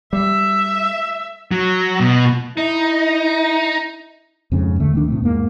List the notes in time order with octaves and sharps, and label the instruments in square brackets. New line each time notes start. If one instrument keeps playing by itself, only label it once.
[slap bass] G3 [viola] E5
[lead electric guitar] F#3
B2
[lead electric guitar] D#4 [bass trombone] E4
[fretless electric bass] F2 G#2 C#3 C#4
D2 D3 A3
D1 D#3 D4
A2 C3 A3
E2 G#2 A#3